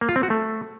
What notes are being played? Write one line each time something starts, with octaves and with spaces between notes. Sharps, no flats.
A#3
F4
C4
F#4
A3